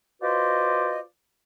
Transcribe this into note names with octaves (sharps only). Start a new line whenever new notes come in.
F4 F#4 B4 C5 D5 D#5